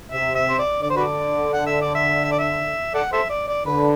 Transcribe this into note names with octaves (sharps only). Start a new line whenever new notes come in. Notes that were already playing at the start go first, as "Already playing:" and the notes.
C3 E5
E5
C5
D5
D3 D5
C5
F#4 B4 D5
F#5
E5
D5
E5
E5
D5
E5
A4 D5 F#5
A4 C5 E5
D5
D5
D3 B4